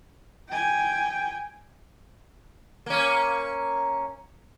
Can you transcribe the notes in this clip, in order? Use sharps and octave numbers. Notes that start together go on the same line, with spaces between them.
G5 G#5
A#3 C#4